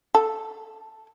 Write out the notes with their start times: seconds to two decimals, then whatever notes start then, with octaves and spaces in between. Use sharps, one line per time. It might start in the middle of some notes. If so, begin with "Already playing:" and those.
0.15 A4